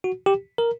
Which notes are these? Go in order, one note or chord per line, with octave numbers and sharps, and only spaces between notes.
F#4
G4
A#4